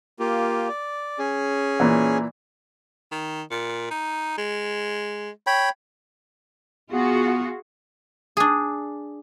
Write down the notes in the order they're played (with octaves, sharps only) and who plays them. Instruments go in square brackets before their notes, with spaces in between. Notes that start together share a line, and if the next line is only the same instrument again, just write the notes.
[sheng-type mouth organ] A#3 F4 G4
D5
C#4 G#4
[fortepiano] A#2 E3
[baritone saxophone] D#3
A#2
D#4
G#3
[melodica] C#5 G5 B5
[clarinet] B3 [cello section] F4 F#4 G#4
[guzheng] D4 G#4